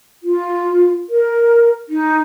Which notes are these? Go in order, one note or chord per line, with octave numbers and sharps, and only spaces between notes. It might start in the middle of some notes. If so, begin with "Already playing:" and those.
F4
A#4
D#4